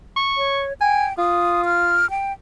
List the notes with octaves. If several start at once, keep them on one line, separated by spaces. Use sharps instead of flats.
C#6
C#5
G5 G#5
F4 D#6
F6
G5